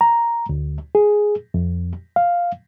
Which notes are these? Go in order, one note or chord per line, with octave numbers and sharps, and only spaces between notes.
A#5
D2
G#4
F2
F5